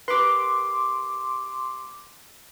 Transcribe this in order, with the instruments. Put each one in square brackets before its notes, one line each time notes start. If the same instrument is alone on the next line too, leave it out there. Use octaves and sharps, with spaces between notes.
[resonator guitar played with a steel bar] G4 A#4 B4 [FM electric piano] C6 D6